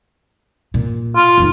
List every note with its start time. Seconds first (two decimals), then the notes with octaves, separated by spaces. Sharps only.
0.74 A#2
1.16 F4
1.38 F#1 D#4